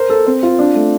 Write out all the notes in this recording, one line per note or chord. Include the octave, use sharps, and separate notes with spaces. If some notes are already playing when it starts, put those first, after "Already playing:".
Already playing: A#4 C5
A4
C4
F4
D4
A3